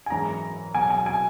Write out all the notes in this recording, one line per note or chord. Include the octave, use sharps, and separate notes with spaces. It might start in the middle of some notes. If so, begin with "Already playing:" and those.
G#5
G#1 F#2 E3 G#3 A#5
B1 B2 F#3 G#5
G#5
G#5